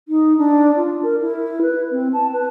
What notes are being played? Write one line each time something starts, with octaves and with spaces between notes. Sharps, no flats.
D#4
D4
F4
A#4
E4
B4
C4
A5
B4